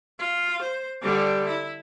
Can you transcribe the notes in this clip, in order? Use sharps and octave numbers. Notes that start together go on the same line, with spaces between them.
F4
C5
D3 G3
E4